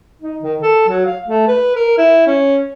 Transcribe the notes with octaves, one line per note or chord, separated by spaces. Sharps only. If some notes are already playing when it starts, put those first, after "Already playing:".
D#4
D#3
A4
F#3
F5
A3
B4
A#4
E4
C#4